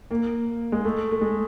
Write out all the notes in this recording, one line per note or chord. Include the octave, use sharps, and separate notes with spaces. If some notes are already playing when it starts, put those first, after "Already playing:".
A#3
G#3
A3
A3
G#3